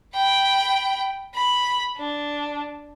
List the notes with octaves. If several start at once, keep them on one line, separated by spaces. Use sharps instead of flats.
G5 B5
B5
D4